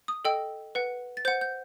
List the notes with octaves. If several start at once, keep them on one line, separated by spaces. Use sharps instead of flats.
D#6
A4 D#5 G5 E6
B4 F#5
A6
C5 F#5 G6
G6